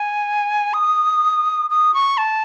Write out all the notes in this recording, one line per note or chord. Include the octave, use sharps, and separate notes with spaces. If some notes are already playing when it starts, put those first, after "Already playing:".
Already playing: G#5
D#6
D#6
C#6
A5